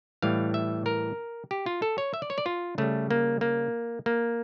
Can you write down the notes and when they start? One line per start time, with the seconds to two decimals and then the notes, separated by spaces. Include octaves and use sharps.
0.22 A2 E3 G3 F5
0.54 E5
0.86 A#4
1.51 G4
1.66 F4
1.82 A4
1.98 C#5
2.14 E5
2.22 D5
2.30 C#5
2.38 D5
2.46 F4
2.78 C#3 G3 A3
3.11 A#3
3.41 A#3
4.06 A#3